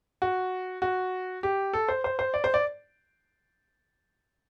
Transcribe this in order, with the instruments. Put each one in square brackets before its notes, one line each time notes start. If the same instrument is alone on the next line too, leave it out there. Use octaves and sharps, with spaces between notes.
[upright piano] F#4
F#4
G4
A4
C5
C5
C5
D5
C5
D5